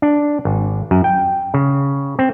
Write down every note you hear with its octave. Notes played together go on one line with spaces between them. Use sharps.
D4
G#1
F#2
G5
C#3
C4